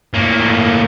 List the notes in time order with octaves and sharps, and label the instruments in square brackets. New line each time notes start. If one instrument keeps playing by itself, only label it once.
[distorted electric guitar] A2 A#3